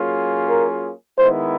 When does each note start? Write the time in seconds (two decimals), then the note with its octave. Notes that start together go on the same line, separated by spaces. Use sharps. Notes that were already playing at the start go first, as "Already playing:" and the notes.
Already playing: F#3 A#3 C#4 F4 G#4
0.48 A#4
1.18 D#3 G#3 B3 E4 C5